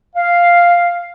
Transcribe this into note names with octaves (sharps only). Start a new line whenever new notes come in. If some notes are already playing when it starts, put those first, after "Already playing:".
F5